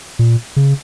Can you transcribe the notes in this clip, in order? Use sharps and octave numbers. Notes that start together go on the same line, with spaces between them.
A#2
C#3